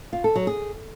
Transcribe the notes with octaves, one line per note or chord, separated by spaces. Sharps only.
F4
A4
F#3
G#4